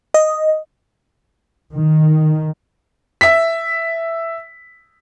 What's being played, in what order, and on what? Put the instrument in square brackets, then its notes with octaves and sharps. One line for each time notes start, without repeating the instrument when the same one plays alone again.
[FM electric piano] D#5
[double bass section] D#3
[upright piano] E5 B6